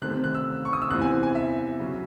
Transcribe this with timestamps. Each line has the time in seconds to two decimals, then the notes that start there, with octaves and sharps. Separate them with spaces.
0.02 C3 D#3 A3 C4 F#6
0.24 F#6
0.35 E6
0.65 C#6
0.73 D#6
0.82 E6
0.90 E2 C3 E3 C4 E4 F#6
1.01 G#5
1.23 G#5
1.35 E5
1.79 C#3 F#3 C#4